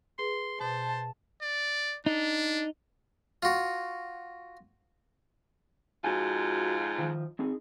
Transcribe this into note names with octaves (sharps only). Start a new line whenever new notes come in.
G#4 B4 C6
B2 C5 A5
D5
D4 D#4
F4 F#4
F2 G#2 F4 F#4 G#5
D#3 F3
C4 D#4 G#4